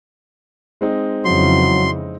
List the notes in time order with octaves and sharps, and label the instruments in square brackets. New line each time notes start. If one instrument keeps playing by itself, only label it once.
[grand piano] G#3 C4 D#4
[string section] F2 C#3 E3 [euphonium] F#3 [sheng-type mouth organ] C6